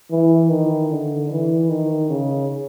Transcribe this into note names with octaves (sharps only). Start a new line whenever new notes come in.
E3
D#3
D3
E3
D#3
C#3